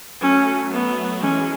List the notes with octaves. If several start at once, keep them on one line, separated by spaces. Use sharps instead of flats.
F#3 A3 C#4
B3
E3 G#3 C#4